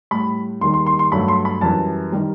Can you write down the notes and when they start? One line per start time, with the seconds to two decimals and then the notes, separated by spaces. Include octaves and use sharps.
0.11 A2 G3 B5
0.61 D#2 D#3 G3 C6
0.74 C6
0.86 C6
0.99 C6
1.12 G2 F#3 A3 B5
1.28 C6
1.45 B5
1.61 F#2 E3 G3 A5
2.12 D#3 G3